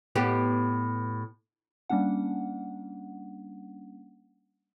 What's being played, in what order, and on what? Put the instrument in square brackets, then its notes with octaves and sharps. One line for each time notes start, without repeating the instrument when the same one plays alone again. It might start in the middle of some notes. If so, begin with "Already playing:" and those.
[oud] A2 B3 G4
[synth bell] G3 A#3 C#4 D4 F#5